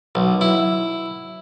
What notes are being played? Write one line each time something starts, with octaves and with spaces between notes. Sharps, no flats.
B1
E4